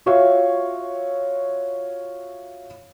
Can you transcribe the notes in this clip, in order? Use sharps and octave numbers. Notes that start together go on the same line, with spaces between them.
F4 F#4 C#5 E5 F5